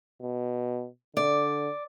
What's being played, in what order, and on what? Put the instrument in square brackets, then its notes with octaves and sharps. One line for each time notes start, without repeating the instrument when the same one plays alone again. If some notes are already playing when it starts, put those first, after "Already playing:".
[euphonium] B2
[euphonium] D3 [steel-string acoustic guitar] D5